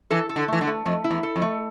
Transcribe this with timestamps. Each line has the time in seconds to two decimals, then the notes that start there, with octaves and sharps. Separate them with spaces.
0.10 E3 A4
0.29 A4
0.36 D3
0.48 E3 A3
0.61 D3
0.67 A3
0.85 F2 A3
1.04 E4
1.11 E2
1.23 A4
1.36 F2
1.42 A3